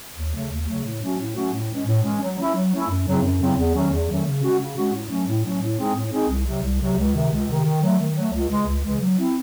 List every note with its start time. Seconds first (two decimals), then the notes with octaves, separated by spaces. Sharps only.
0.17 D#2
0.34 C#3 F#3 A3
0.51 D#2
0.68 C#3 F#3 A3
0.85 A2
1.02 F#3 A3 C#4 F#4
1.19 A2
1.36 F#3 A3 C#4 F#4
1.53 A2
1.70 E3 G#3 C#4
1.87 A2
2.04 E3 G#3 C#4
2.21 F#3
2.38 A3 C#4 E4
2.55 F#3
2.72 A3 C#4 E4
2.89 F#2
3.06 C#3 F#3 C4 E4
3.23 F#2
3.40 C#3 F#3 C4 E4
3.57 E2
3.74 D#3 F#3 A3 C#4
3.91 E2
4.08 D#3 F#3 A3 C#4
4.25 C#3
4.42 G#3 C#4 F#4
4.59 C#3
4.77 G#3 C#4 F#4
4.93 A2
5.10 F#3 A3 C#4
5.27 A2
5.44 F#3 A3 C#4
5.61 A2
5.78 G#3 C4 D#4 G#4
5.95 A2
6.12 G#3 C4 D#4 G#4
6.29 C2
6.46 C3 F#3
6.63 C2
6.80 C3 F#3
6.97 C#2
7.14 C3 D#3
7.31 C#2
7.48 C3 D#3
7.65 D#3
7.82 F#3 A3
7.99 D#3
8.16 F#3 A3
8.34 C#2
8.50 C#3 E3 G#3
8.67 C#2
8.84 C#3 E3 G#3
9.01 F#3
9.19 C4 E4